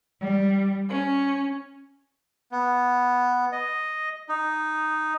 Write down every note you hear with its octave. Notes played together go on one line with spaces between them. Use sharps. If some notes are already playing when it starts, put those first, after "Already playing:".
G3
C#4
B3
D#5
D#4